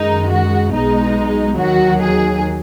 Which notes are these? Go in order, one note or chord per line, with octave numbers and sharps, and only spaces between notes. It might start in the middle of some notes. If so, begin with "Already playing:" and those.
Already playing: F#2 D#3 G#3 D#4
F#4
B1 B2 G#3 D#4
D#2 D#3 F#3 F#4
G#4